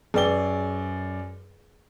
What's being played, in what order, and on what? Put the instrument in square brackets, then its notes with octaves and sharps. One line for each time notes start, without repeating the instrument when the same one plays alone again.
[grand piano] F#2 D5 G7 [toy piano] G#4 B4 G5